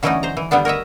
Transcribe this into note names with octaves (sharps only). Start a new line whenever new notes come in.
D3 E3 F#3 A3 C#4 D#4
C5 A#5
E3
D3 G3 B3 D4
A#4 C#5 D#5 E5